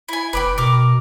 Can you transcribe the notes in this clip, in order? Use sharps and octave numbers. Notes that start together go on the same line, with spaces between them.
E4 G#5
F1 B4 D5 G5
B2 A#4 D6